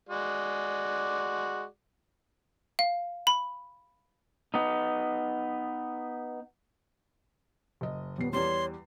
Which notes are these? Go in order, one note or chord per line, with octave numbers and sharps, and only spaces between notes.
G#3 F#4 D5
F5
B5
B3 D#4
F#1 D#5
D#1 B3 C7
E2 G3 C#5 C6